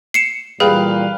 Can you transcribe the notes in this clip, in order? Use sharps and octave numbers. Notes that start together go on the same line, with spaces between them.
C7 C#7 E7
A#2 E3 G3 G#4 B4 F5 G5